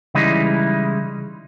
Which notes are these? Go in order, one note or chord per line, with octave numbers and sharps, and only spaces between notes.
C#3 E3 G3 G#3 D#4 E4